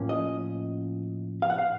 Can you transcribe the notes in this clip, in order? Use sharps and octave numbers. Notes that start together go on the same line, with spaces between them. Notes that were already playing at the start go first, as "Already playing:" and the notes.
Already playing: A2 F3 A#3 C#4
D#5
F5
F#5
F5